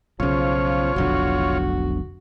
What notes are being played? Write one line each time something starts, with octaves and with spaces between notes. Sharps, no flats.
B1 C#3 F3 F4 C#5
F1 B1 D3 F#4